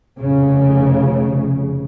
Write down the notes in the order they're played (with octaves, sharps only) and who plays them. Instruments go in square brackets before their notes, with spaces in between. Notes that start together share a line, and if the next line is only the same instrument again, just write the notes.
[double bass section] F1 C#3